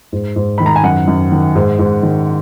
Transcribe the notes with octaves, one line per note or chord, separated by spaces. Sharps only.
G#2
G#2
D#3 B5
A#5
G#5
F#2 F#5
F#2
D#3
G#2
G#2
D#3